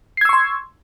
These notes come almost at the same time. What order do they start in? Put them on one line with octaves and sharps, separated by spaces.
C7 G#6 E6 C#6 C6